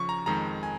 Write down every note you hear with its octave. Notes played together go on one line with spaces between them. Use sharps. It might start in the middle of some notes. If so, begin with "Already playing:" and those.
Already playing: C#3 F3 C#4 C#6
A#5
F2 D#3 G#3 A#5
G#5